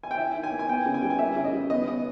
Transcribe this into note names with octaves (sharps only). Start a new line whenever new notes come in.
G#5
G5
E4 E5
D#3
G#5
A#3
G#5
B3 G5
C#3
G#5
G3 G5
G#5
A#3 E5
C#3
D#5
G3
B3 D#5
D#5